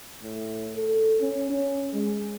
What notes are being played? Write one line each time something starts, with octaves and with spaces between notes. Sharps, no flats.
A2
A4
C#4
C#4
G#3